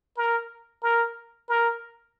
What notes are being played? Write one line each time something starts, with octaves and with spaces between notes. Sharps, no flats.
A#4
A#4
A#4